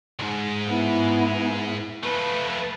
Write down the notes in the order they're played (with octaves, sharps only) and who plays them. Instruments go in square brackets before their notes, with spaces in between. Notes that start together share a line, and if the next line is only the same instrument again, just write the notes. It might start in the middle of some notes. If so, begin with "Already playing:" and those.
[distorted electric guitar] C2 G#2
[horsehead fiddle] B3 E4
[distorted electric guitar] F3 A3 [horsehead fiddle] B4